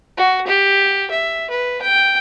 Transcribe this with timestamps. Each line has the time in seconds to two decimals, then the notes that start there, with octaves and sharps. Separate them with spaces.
0.17 F#4
0.47 G4
1.11 E5
1.51 B4
1.82 G5